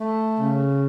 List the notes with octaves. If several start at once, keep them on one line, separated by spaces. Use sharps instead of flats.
A3
C#3